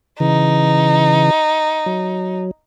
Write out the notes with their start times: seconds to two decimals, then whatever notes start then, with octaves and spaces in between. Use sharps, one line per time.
0.20 C#3 E3 D#4
1.86 F#3